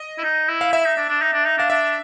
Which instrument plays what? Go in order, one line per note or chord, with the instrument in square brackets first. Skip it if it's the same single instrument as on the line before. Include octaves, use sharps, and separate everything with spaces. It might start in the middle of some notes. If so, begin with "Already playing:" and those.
Already playing: [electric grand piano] D#5
[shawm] E4
D#4
E4
[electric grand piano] F5
[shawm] E4 [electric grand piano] E5
[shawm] D#4
D4
D4
D#4
D4
D#4
[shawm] D4 [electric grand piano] F5
[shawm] D4 [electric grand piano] E5